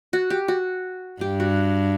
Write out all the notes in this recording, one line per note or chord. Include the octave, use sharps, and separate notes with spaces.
F#4
G4
F#4
G2 G4
F#4